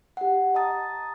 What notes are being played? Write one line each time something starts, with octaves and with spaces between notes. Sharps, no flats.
G4 F#5
D#5 A5 A#5 D#6 A6